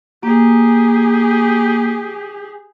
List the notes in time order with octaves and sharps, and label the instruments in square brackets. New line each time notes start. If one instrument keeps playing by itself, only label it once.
[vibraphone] A#3 [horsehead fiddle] G4 G#4